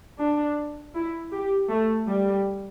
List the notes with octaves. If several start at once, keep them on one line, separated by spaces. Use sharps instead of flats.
D4
E4
G4
A3
G3